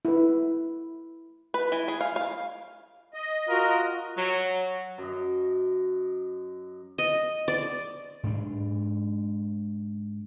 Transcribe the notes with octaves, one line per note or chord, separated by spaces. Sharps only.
E4 B4
B4
E3
G#4
F5
F5
D#5
F4 F#4 A#4
F#3
F#2 D#5
D#5
D5
G#2 D4